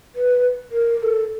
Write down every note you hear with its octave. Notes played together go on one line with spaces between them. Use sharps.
B4
A#4
A#4
A4